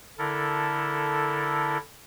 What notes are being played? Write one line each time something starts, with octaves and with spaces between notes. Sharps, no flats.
D3 E4 A4 A#4